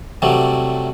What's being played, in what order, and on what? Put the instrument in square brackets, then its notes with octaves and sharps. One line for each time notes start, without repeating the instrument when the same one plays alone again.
[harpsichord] C3 F#3 G3 A3